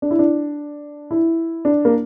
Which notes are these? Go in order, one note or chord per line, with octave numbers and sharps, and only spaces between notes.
D4
E4
D4
E4
D4
A#3